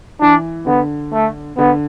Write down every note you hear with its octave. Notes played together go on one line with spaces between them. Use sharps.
E3 D4
D3 B3
A3
D3 B3